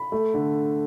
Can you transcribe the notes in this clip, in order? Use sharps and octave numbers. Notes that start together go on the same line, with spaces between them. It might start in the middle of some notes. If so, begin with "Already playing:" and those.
Already playing: B5
A3
D3